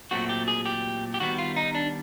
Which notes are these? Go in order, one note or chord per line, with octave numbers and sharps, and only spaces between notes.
A#2 F#3 A3 C4 F#4
G4
G#4
G4
G4
D#3 G3 B3 F#4
F4
D#4
D4